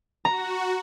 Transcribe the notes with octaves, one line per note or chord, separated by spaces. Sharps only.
F#4 A#5